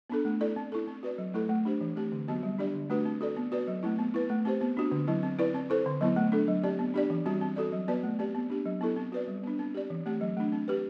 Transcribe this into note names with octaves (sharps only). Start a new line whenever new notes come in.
B3 D4 A4
A3
E4 A4 D5
C4
E4 A4
C4
F#4 B4 D5
F#3
A3 E4 A4
A3
D4 G4 C5
E3
A3 C4 G4
D3
F#3 B3 F#4
G3
D4 G4 D5
D3
A3 D4 F#4 B4
C4
F#4 A4 D5
B3
F#4 B4 D5
F#3
A3 C4 E4
B3
E4 B4
A3
C4 G4 C5
B3
D4 F#4
D3
F#3 C4 E4
C4
E4 B4 D5
C4
E4 A4 C5
D3
F#3 B3 E4
A3
D4 A4
F#3
C4 G4 D5
B3
D4 G4 D5
E3
G3 C4 F#4
C4
F#4 A4 D5
F#3
B3 F#4 B4 D5
A3
C4 G4 D5
B3
D4 G4
F#3
B3 E4 A4
C4
F#4 B4 D5
G3
B3 D4
C4
G4 D5
E3
A3 C4 G4
F#3
A3 D4
C4
G4 B4